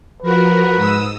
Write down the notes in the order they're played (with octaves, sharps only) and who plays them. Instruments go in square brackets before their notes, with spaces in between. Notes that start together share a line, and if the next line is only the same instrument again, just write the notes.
[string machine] F3 F#4 A#4 [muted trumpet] B4
[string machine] G#2 D#6 E6